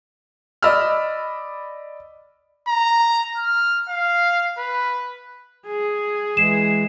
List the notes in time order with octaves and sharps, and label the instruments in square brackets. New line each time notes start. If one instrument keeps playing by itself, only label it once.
[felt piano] D5 D#5 B5 E6 F6
[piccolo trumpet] A#5
F6
F5
B4
[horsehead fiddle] G#4
[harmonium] E3 G#3 [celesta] C7 E7